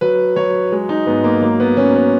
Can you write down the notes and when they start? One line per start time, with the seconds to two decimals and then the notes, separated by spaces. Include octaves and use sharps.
0.01 F#3 B4
0.36 F#3 C#5
0.72 G#3
0.89 D#4
1.07 G#2 B3
1.24 A#3
1.42 F#3 A#3
1.60 B3
1.77 F#3 C#4
1.95 B3